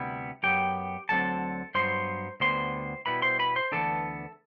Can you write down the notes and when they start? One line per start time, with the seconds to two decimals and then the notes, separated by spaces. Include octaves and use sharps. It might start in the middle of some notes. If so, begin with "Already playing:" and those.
Already playing: D2 C3 G3 B3 E4
0.43 F#2 F#3 B3 G4 G5
1.09 D2 D3 F#3 C4 A4 A5
1.75 G2 F#3 B3 C5 C6
2.40 D2 D3 G3 B3 C5 C6
3.06 B2 G3 B3 E4 B4 B5
3.22 C5 C6
3.39 B4 B5
3.56 C5 C6
3.72 D2 C3 E3 B3 D4 A4 A5